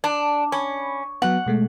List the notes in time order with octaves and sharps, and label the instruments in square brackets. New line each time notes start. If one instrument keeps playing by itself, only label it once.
[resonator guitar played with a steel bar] D4
[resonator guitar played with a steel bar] C#4 [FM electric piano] B5
[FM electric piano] F#3 B3 [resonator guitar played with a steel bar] F#5
[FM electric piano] B2 G#3 A3